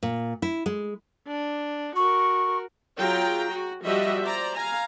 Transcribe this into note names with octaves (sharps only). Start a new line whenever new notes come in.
A#2
E4
G#3
D4
F#4 A#4 C#6
F#3 F4 G#4 G5 A#5
F#4
F3 G3 F#4 D#5 E5
C5 D5 A#5
F5 G#5 A#5